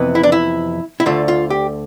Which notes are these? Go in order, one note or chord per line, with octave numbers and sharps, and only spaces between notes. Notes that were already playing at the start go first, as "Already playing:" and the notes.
Already playing: F2 C3 E3 B3
E4
D4
E4
E4
D2 D3 A3 F4
F4
G4